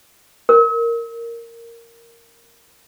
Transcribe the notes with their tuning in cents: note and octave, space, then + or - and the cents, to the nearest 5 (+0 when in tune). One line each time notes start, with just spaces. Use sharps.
A#4 -10